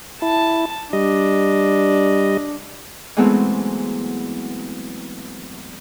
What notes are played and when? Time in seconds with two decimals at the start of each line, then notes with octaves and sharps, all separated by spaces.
0.22 E4 A5
0.93 G3 D4 D#5
3.17 E3 F#3 G#3 A3 B3 C4